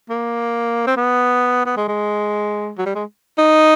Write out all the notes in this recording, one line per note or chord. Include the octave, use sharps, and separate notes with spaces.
A#3
C4
B3
B3
G#3
G#3
F#3
G3
G#3
D#4